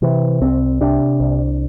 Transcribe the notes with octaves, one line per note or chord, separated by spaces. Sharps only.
C3 E3
C2 C4
C3 D4
C2